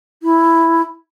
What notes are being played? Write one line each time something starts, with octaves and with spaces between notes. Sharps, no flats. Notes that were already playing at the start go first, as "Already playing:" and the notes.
E4